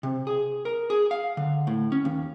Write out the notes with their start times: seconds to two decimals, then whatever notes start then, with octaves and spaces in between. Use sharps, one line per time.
0.03 C3
0.27 G#4
0.65 A#4
0.90 G#4
1.11 F5
1.37 D3
1.67 A2
1.92 C#4
2.05 D#2